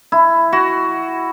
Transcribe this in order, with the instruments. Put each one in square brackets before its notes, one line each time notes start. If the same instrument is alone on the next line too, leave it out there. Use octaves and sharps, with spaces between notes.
[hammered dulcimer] E4
F#4